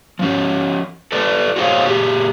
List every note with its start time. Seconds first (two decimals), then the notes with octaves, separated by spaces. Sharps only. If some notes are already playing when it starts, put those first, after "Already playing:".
0.19 F3 C#4
1.12 A4 B4 D5
1.56 F#4 G#4 C5 C#5 D#5 F5
1.85 A#2 G4 G#4